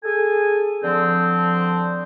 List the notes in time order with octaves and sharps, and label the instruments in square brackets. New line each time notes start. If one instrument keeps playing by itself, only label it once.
[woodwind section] G#4 A4 G#5
D3 F3 C4